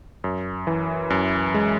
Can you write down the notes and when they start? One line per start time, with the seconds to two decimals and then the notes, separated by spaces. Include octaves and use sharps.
0.24 F#2
0.67 E3
1.10 F#2
1.54 G#3